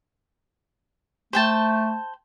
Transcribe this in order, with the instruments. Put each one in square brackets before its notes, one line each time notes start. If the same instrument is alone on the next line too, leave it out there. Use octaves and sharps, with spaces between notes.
[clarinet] A3 [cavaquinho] C5 G5 A5